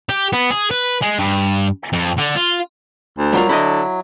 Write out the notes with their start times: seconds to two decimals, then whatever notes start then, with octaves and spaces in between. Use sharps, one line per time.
0.09 G4
0.33 B3
0.51 G#4
0.71 B4
1.02 G#3
1.19 G2
1.93 F2
2.18 D3
2.36 F4
3.18 D2
3.33 F#3 G3 F4 A#4
3.49 D3 E4 D#5